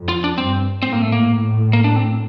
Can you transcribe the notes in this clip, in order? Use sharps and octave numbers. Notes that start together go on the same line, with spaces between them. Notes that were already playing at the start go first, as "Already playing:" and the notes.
Already playing: F2
F4
D4
G2 C4
A2 C4
A#3
A3
A#3
A2
A#3
D4
C4